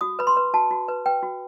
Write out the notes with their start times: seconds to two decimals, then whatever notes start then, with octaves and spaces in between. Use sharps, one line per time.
0.01 F#4 D#6
0.19 B4 B5
0.27 C6
0.37 B4
0.54 F#4 A5
0.71 F#4
0.88 B4
1.06 B4 G5
1.23 F#4